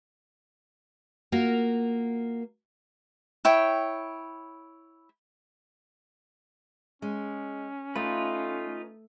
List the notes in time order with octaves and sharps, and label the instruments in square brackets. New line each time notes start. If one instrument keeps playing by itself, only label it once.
[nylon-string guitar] A#3 F4 F#4 A#4
[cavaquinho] E4 C#5 G5
[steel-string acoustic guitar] G#3 [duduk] C#4
[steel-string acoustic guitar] A3 [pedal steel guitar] D#4 F4 B4